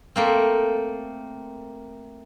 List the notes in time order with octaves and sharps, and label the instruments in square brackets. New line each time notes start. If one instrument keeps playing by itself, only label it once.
[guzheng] A3 A#3 C4